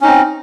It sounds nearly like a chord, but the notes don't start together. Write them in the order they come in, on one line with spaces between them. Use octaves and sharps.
C#4 D#4 C4